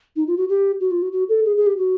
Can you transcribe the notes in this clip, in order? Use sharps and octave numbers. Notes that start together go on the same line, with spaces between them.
D#4
F4
F#4
G4
F#4
F4
F#4
F#4
A4
G#4
G#4
G4
F#4